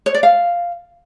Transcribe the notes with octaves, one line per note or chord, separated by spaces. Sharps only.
C#5
D5
F5